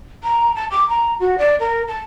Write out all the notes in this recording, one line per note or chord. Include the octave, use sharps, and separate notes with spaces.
A#5
A5
D6
A#5
F#4
D5
A#4
A5